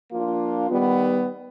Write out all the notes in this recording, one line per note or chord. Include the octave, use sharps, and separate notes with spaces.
F3 A#3 D4 F4
D#3 G3 B3